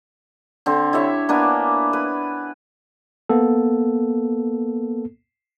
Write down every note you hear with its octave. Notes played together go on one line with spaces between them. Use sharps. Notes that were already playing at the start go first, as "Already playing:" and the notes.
D3 C4
E4 G4 C#5 E5
A#3 B3 D4 G#5
B4
A#3 B3 A4